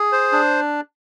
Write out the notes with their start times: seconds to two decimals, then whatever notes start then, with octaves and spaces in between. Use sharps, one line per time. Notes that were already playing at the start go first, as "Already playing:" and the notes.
Already playing: G#4
0.12 C5
0.32 D4